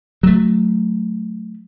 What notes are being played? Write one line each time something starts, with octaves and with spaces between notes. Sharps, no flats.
F#3 A3